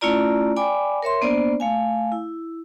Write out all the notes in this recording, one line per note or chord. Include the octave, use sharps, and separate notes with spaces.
A3 C#4 E4 F4 D5 A#5
D5 G5 G#5 B5 D6
A#4 C#5 E5 C6
A#3 B3 D4 C5 D5
A3 F5 G#5
E4